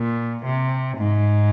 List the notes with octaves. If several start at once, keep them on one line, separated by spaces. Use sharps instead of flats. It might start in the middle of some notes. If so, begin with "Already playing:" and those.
Already playing: A#2
C3
G#2